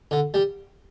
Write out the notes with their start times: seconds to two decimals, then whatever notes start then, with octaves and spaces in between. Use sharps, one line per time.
0.11 D3
0.34 G3